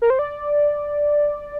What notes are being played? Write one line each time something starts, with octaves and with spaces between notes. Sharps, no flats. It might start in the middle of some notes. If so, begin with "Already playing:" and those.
A#4
C5
D5